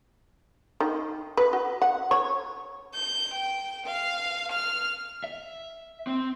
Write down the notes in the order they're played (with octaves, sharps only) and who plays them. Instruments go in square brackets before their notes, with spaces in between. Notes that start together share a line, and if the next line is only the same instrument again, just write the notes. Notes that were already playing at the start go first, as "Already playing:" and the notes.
[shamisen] D#3
B4
F#4
F#5
C#5
[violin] G6
G5
F5
F6
[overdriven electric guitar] E5
C4